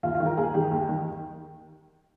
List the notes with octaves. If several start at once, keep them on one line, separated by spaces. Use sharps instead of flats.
D#2 F4
F4
D#3
A#4
D#2 G#4
D#3 G4
D#2
D#3